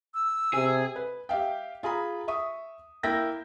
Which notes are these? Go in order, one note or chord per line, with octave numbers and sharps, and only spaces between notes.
E6
C3 G#4
B4
G4 E5 F5 G5
F4 G#4 A#5 B5
E5 C#6 D#6
A#3 E4 G5 G6 A#6